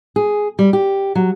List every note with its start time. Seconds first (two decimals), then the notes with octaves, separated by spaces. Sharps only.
0.16 G#4
0.59 G3
0.73 G4
1.15 F#3